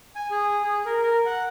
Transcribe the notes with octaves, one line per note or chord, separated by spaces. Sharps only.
G#5
G#4
G#4
A#4
A#4
F#5